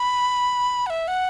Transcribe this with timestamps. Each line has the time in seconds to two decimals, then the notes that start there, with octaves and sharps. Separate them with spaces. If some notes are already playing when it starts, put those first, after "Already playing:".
Already playing: B5
0.86 F#5
0.90 E5
1.08 F#5